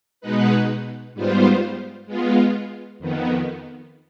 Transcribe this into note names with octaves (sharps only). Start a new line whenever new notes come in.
B2 G#3 B3 D#4 B4
G#2 G3 B3 F4 C5
G#3 B3 F4
F2 D#3 B3